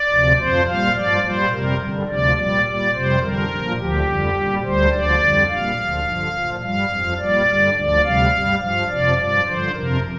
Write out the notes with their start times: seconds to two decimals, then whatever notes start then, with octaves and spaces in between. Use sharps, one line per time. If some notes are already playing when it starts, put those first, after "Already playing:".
Already playing: D5
0.09 D2 C3 F3
0.37 F2 F3 C5
0.67 A#2 G3 F5
0.94 G2 F3 D5
1.23 A#2 G3 C5
1.51 F2 C3 G3 A#4
1.80 G2 D3 G3
2.08 D2 C3 F3 D5
2.37 A#2 G3 D5
2.65 A#2 G3 D5
2.93 F2 C3 G3 C5
3.21 F2 D3 G3 A#4
3.50 A#2 F3
3.78 D2 D3 F3 G4
4.07 F2 D3 G3
4.35 A#2 G3
4.63 D2 D3 G3 C5
4.92 D2 D3 F3 D5
5.20 F2 D3 G3
5.48 A#2 G3 F5
5.77 D2 D3 F3
6.06 G2 D3 F3
6.33 A#2 F3
6.62 G2 G3 F5
6.90 F2 F3
7.19 A#2 G3 D5
7.48 G2 D3 G3
7.76 D2 D3 F3 D5
8.04 D2 C3 G3 F5
8.33 G2 G3
8.61 G2 F3 F5
8.89 F2 C3 F3 D5
9.18 G2 F3 D5
9.46 G2 D3 F3 C5
9.74 F2 C3 F3 A#4